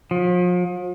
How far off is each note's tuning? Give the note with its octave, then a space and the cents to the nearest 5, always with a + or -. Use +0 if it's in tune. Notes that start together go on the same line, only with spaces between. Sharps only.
F3 +40